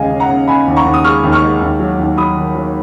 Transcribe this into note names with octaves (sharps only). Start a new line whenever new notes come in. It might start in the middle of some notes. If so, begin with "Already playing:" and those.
Already playing: D#2 C#3 G#3 D#5 F5 G#5
C#3
F#5 A#5
C#3
C#3 G#5 B5
D#2
A#5 C#6
D#2
D#6
G#3 C#6 F6
D#2
C#6 F6
G#3
D#2
F#3
D#2
F#3 B5 D#6
D#3
F#3